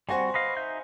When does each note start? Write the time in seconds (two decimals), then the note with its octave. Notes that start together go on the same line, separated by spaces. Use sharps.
0.09 G3 C4 F#4 C5 F#5 G#5
0.34 B4 D#5 F5
0.57 D#4 E5 G6